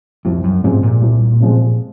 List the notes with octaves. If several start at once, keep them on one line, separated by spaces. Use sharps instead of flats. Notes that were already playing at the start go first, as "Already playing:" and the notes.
C2 F2
F#2
G#2 C3 F3 G#3 C4
A#2
C2
C3 F3 G#3 C4